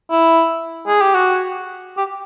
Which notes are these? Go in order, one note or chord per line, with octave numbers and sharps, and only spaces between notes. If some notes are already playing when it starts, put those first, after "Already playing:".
E4
G#4
G4
F#4
G4